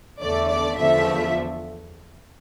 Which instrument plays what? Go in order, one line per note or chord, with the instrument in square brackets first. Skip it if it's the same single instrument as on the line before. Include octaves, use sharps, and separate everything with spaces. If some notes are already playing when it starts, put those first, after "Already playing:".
[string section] E2 D3 A3 D5
D5
E2 D3 F3 A3 E5